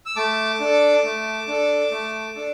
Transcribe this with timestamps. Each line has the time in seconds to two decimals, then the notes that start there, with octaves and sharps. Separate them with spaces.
0.06 E6
0.16 A3 A5 D6
0.60 D4 A4
1.04 A3
1.48 D4 A4
1.91 A3
2.36 D4 A4